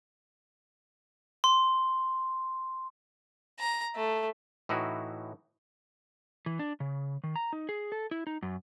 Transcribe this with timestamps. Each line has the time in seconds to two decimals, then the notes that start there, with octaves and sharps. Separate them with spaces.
1.44 C6
3.59 A#5
3.96 A3
4.69 A2 E3 D#4 E4 F#4
6.46 E3
6.59 D4
6.80 C#3
7.24 D#3
7.36 A#5
7.53 D#4
7.69 G#4
7.92 A4
8.11 E4
8.27 D#4
8.43 F#2